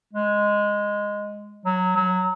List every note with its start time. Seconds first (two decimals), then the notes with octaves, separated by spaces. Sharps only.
0.13 G#3
1.66 F#3
1.96 F#3